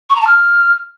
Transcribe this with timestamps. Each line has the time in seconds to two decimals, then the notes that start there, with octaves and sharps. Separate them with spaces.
0.09 C#6
0.15 A#5
0.21 A5
0.26 F6